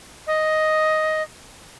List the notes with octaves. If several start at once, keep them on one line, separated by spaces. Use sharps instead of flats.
D#5